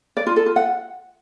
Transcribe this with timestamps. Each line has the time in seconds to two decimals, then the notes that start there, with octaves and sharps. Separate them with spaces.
0.17 D5
0.26 F4
0.36 A4
0.46 F4
0.56 F#5